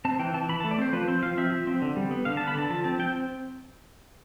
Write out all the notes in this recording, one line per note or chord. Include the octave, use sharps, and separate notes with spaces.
C4 A5
E3 G5
E3 A5
E3 B5
A5
A3
D5
C4 C5
F3 B4
C4 C5
F3 F5
C4 E5
F3
C4
D3
G3
B3
D3 F5
A5
B3
B5
D3 A5
F3 A5
C4 A5
C4 G5